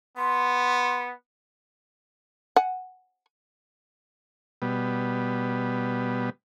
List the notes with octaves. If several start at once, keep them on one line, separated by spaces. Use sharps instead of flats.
B3 C6
F#5 G#5
B2 G3 B3